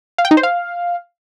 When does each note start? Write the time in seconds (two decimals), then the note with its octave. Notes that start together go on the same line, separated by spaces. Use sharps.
0.18 F5
0.25 G5
0.31 D#4
0.37 C5
0.43 F5